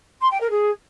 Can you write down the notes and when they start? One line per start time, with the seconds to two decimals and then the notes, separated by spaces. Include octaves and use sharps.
0.21 C6
0.31 G5
0.40 A#4
0.50 G#4